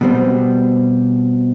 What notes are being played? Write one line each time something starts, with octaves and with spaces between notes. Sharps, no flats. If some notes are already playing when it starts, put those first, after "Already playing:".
B2 G3 C4